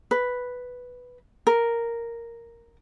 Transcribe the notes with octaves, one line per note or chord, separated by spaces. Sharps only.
B4
A#4